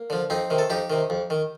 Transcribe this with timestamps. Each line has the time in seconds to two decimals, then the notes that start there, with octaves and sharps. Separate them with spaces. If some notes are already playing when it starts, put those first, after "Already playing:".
Already playing: A#3
0.10 D3 F3
0.30 F2 C4 D#4
0.50 C3 D#3
0.58 A4
0.70 F2 D#4 G4
0.90 C3 D#3
1.10 F2
1.30 D#3